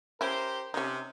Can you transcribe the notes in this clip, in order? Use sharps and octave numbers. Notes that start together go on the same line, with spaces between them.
C#4 E4 G4 A#4 C5
C3 C#4 D#4